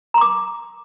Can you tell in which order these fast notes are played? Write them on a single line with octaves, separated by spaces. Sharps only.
A#5 C6 D6